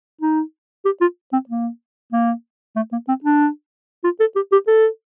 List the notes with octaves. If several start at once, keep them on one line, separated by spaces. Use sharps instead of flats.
D#4
G4
F4
C4
A#3
A#3
A3
A#3
C4
D4
F4
A4
G4
G4
A4